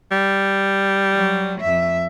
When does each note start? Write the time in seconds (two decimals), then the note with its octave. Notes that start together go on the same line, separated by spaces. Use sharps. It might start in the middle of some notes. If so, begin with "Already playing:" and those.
0.11 G3
1.13 F#3
1.61 F2 E5